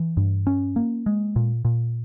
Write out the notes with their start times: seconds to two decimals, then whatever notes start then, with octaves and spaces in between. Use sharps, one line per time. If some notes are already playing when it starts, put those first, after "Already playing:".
Already playing: E3
0.17 G2
0.47 C#4
0.76 A#3
1.06 G#3
1.36 A#2
1.65 A#2